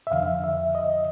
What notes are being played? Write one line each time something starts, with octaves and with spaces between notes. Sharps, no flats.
E5
F2 D3 F3 F5
E5
D#5